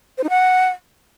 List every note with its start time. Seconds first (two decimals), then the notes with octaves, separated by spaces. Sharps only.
0.18 C5
0.24 D#4
0.30 F#5